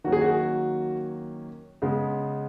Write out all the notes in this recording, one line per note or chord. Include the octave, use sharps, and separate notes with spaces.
D#3 F#3 A#3 C#4 F#4
G#4
F#4
C#3 G#3 B3